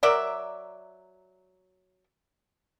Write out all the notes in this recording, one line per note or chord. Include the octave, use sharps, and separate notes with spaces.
F#3 A#4 D5 E5